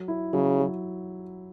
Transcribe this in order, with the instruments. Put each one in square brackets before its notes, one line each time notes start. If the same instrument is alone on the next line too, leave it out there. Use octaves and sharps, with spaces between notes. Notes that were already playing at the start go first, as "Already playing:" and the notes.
Already playing: [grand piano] F#3
E4
[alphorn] C#3 [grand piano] F#3
[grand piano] F#3